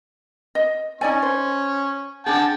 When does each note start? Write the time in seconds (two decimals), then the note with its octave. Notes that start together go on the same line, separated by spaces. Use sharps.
0.55 D#5
1.01 C#4 D#4 D5 G#5 C#6
1.22 C5
2.26 D4 G#4 F#5 G5 A5